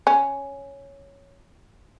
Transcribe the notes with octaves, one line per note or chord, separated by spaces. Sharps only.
C#4